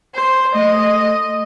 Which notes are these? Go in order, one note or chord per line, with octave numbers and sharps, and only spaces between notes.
C5
A3 D#5